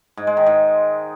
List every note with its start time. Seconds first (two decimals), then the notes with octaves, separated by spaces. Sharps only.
0.17 G#2
0.27 G#3
0.37 D#3
0.47 G#2